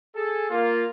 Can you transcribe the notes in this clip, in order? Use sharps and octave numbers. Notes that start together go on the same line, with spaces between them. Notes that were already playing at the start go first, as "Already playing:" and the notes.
G#4 A4
A#3 F4